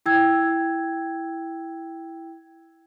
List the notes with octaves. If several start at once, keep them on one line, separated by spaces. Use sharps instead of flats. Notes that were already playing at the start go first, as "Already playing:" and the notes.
E4 G5 E6 G#6